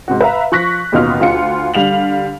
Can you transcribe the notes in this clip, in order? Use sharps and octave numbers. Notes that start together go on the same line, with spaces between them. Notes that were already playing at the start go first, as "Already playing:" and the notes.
G#2 C3 F#4
B4 E5 F5 A#5
F3 C#6 F#6 A#6 B6
A1 D#2 B2 D#4 F4 F6
D2 F4 C#7
D3 G3 F5 F7 F#7